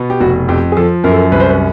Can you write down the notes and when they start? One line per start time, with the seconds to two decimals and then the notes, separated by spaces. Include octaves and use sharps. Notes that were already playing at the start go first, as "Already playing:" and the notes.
Already playing: B2 B3
0.10 G4
0.20 F1 F#4
0.49 F2 G4
0.72 G#4
0.77 F3 A4
1.04 F#2 A#4
1.11 A4
1.18 A#4
1.32 C2 B4
1.40 C5
1.49 B4